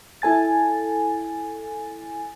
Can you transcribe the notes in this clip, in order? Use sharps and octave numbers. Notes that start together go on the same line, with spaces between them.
E4 A4 G#5 A6